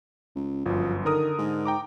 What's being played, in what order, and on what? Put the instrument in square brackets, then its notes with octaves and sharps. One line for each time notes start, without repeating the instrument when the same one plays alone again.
[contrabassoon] C#2
[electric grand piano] G1 F#2 [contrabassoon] F3
[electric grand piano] D3 A#4 D#6 [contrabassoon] D#3
[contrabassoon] G#2
[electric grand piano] G5 A#5 D6